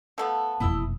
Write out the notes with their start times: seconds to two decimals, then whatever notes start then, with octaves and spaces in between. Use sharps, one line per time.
0.18 F3 A3 B3 A4
0.60 F1 E2 B2 A#3 E4 D#5 E6